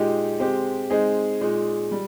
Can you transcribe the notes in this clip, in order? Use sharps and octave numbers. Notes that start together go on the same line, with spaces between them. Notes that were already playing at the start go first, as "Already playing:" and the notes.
Already playing: A#2 G#3 D#4 G4
G#3 C4 G4
G#3 C4 D#4 G#4
A#2 G#3 D#4
G3